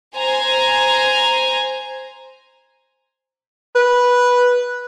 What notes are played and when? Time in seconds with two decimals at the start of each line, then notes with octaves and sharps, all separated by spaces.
0.16 C5 G#5 A#5
3.75 B4